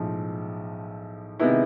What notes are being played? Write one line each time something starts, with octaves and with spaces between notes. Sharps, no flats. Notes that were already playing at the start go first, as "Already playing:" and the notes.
Already playing: B1 A2 F3 G#3
C3 D#3 G#3 B3 E4